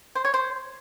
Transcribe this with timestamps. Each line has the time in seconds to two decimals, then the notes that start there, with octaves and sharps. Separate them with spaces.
0.15 C5
0.25 C#5
0.34 C5